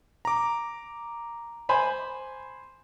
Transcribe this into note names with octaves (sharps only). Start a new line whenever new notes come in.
A#5 D6
C5 G#5 B5